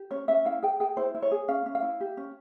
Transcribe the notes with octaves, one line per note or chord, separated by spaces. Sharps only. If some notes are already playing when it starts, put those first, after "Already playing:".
Already playing: G4
C#4 C#5
C#4 E5
E4 F5
G#4 G5
G#4 G5
E4 C5
E4
C#5
G#4
C#4 F5
C#4
F5
E4
G4
C#4